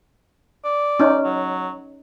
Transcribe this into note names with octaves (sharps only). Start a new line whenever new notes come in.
D5
C#4 D#4
F#3